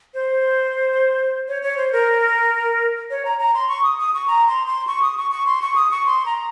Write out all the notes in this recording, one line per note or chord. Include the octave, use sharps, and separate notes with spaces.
C5
C#5
C#5
C5
A#4
C#5
A#5
A#5
C6
C#6
D#6
D#6
C#6
A#5
C6
C6
C#6
D#6
C#6
C#6
C6
C#6
D#6
C#6
C6
A#5